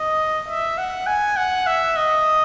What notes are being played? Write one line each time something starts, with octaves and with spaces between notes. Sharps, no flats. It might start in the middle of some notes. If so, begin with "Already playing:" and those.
Already playing: D#5
E5
F#5
G#5
F#5
E5
D#5